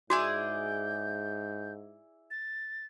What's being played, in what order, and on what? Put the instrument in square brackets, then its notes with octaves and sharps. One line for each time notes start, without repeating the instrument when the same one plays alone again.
[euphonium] G#2 [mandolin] E4 G#4 D5 [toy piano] F#4 [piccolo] G6
[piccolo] A6